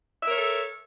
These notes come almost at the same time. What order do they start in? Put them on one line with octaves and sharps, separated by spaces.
E5 A#4 C#5 A4